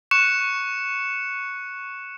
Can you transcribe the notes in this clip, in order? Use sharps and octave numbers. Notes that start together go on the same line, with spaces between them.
C#6 F#6 C#7 E7